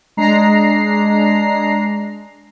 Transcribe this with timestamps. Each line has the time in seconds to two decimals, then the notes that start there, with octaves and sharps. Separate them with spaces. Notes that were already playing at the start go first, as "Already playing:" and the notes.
0.17 G#3 D4 A#5 C7